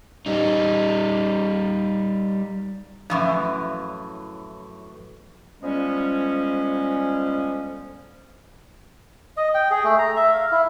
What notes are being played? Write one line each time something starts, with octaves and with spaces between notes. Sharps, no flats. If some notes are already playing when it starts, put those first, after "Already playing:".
G3 D#4
F#2 A2 E3 F3
D3 F3 G3 G#3 B3 C#4
D#5
G5
G#4
A3
A#5
E5
F5
E4